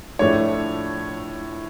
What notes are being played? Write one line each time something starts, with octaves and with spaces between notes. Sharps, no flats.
A2 F3 A3 D4 C#5